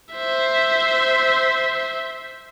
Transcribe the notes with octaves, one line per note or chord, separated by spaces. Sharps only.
C5 E5